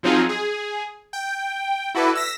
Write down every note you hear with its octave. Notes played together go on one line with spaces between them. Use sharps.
F3 F#3 C4 D#4 F4 G#4
G#4
G5
E4 F#4 A4 B4 D5
E6 A#6 B6